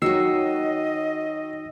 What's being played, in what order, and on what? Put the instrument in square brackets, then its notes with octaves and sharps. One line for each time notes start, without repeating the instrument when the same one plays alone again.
[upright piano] D#3 F#3 [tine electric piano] D#4 E6 C7 [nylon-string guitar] F#4 C#5 [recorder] D#5